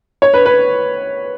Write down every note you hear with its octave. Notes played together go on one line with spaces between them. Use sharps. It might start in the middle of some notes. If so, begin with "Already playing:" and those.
C#5
B4
B4